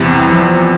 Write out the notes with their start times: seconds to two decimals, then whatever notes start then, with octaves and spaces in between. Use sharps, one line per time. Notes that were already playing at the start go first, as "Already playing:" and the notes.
Already playing: E2 C3 E3 G3 C4 E4
0.30 F3